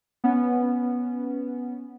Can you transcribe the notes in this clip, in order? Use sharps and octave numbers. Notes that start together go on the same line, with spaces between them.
B3 C#4